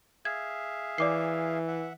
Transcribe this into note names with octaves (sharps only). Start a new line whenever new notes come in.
G#4 E5 F5 G#6
E3 D5 D6 C7
E5 F#5